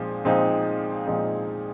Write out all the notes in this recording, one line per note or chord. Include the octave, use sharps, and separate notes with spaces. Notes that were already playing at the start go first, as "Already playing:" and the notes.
Already playing: A#2 F3 G#3 C4 D#4
A#2 F3 G#3 C4 D#4
A#2 F3 G#3 C4 D#4